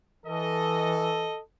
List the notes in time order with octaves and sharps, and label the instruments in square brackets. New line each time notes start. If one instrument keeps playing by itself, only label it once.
[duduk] E3 [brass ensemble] A4 D#5